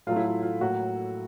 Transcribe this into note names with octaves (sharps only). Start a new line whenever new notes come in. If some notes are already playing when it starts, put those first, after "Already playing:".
A2 F#3 A3 F4
E4
F4
F4
A2 F#3 A#3 F#4